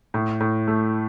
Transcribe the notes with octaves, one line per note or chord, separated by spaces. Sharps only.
A2
A2
A3